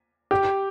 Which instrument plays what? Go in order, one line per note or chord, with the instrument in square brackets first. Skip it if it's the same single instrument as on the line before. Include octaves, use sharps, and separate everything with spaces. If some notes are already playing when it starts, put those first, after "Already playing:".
[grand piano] G4